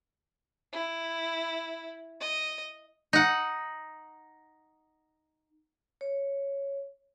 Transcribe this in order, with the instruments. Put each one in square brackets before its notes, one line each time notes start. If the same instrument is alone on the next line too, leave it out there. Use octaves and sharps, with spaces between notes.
[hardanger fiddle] E4
D#5
[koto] D#4 F#5
[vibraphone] C#5